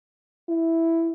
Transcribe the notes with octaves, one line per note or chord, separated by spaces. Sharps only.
E4